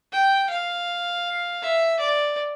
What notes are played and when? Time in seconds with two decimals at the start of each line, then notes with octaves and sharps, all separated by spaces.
0.12 G5
0.50 F5
1.62 E5
1.99 D5